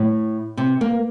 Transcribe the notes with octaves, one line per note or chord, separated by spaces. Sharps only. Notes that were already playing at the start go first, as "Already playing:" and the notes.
Already playing: A2
C3
A#3